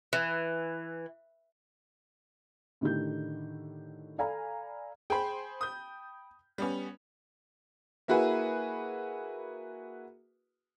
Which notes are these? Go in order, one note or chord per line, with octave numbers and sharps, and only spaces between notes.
E3
A2 D3 D#3 E4 G4 G6
A4 D5 F5 G#5 A#5 B5
G#4 C5 G5 B5
D#6 G6
G3 B3 C#4
A#3 E4 F#4 G#4 B4